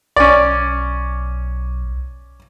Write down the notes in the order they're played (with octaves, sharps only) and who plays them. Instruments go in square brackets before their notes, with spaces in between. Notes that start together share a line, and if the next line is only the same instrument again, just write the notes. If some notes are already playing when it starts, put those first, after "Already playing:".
[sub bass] B1 [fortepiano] C#4 D5